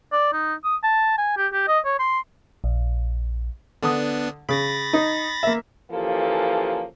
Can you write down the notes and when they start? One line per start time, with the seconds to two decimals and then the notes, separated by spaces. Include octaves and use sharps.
0.12 D5
0.33 D#4
0.64 D#6
0.83 A5
1.18 G#5
1.37 G4
1.53 G4
1.67 D#5
1.85 C#5
1.99 C6
2.64 A#1
3.83 D3 B3 D4 D#6
4.49 C#3 B5 A6 A#6
4.93 D#4
5.43 A#3 E5
5.91 C#3 E3 F3 A#3 G4 A4